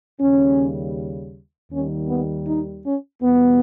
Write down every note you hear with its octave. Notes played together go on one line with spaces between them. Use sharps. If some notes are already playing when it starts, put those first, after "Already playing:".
D#2 C#3 G3 C#4
D#2 D#3 G3 C#4
B3
D#4
C#4
E2 B2 G3 B3